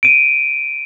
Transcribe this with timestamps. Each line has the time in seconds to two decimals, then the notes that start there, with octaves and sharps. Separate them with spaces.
0.03 D7 D#7